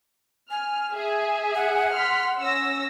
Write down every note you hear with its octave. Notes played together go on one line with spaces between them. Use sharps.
G#5 F6
G#4 E5
F#5
C6 F6 B6
C#4 E6 A#6